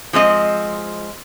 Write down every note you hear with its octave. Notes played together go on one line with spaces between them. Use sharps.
F3 G#3 C4 D#5